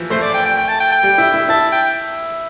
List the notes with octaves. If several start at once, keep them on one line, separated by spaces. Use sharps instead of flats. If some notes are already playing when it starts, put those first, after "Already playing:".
Already playing: E3 F3
A3 C5
D5
G5
G5
G5
A5
G5
G5
G3
E4
E4
E4 A5
G5